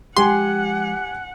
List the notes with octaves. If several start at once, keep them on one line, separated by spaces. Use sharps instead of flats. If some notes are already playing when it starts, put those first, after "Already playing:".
F3 G#3 G4 F#5 G#5 C6